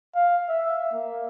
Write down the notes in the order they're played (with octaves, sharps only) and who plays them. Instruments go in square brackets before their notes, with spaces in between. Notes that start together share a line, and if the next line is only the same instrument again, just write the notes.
[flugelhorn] F5
E5
A#3